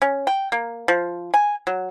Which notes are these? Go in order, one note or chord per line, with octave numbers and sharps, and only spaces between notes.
C#4
G5
A#3
F3
G#5
F#3